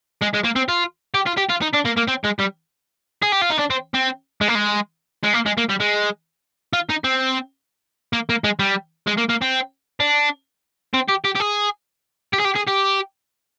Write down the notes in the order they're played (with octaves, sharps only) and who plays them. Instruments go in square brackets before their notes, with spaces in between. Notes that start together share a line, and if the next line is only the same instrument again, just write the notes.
[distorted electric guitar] G#3
G#3
A#3
C4
F4
G4
F4
G4
F4
D#4
D4
A#3
A#3
C4
G#3
G3
G#4
G4
F4
D#4
D4
C4
C4
G#3
A#3
G#3
G#3
A#3
G#3
A#3
G3
G#3
F4
D#4
C4
A#3
A#3
G#3
G3
G#3
A#3
A#3
C4
D4
C4
G4
G4
G4
G#4
G4
G#4
G4
G#4
G4